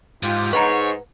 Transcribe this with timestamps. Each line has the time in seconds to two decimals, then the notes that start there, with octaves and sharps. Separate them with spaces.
0.23 G#2 F4 G4
0.53 G#2 B4 C#5 F#5 A#5